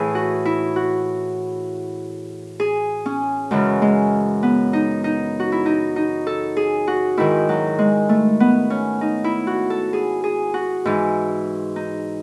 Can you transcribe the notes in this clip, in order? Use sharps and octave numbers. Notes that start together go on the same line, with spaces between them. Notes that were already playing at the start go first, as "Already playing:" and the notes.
Already playing: A2 E3 G#4
F#4
E4
F#4
G#4
C#4
F#2 C#3 E3 G#3
G#3
B3
D#4
D#4
F#4
E4
D#4
D#4
A4
G#4
F#4
G#2 D#3 E4
F#3
G#3
A3
B3
C#4
D#4
E4
F#4
A4
G#4
G#4
F#4
G#2 E3
D#4